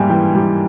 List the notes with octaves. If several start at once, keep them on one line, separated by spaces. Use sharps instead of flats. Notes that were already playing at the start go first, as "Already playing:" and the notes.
Already playing: G#2 G3 A#3 E5 G#5
E3 G5
G3